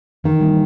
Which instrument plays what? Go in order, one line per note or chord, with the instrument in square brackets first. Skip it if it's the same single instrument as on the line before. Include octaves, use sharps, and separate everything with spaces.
[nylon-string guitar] D#3 [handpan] E3
[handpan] G3 A#3